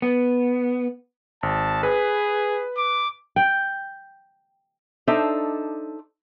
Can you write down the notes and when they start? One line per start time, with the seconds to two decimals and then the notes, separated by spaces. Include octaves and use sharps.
0.02 B3
1.43 G#1 A5
1.83 G#4 B4
2.77 D6
3.36 G5
5.07 D4 D#4 A4 C5 E5